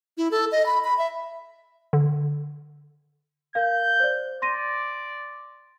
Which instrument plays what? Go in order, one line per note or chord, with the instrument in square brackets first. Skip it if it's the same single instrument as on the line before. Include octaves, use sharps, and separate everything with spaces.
[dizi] E4
A4
D#5
B5
B5
E5
[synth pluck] D3
[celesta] A#4 F5 [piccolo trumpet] G6
[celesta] C5 D5
[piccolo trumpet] D5 [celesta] C6 A#6 D#7